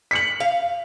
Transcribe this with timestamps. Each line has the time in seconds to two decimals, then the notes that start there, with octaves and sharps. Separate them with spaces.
0.11 B6 C#7 F#7
0.40 F5